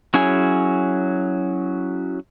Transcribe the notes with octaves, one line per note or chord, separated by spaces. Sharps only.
F#3 C#4 E4 G#4 G#5